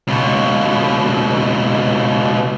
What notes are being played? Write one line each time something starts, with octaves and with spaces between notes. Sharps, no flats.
C#2 B2